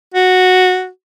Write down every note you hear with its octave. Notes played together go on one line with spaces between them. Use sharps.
F#4